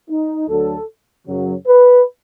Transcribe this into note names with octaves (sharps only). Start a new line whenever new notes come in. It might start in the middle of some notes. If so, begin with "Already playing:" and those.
D#4
D2 D3 F#3 A4
F#2 C#3 F#3
B4